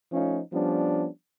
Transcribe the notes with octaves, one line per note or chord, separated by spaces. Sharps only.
F3 A3 C#4 D#4 F4
F3 G3 B3 C#4 D4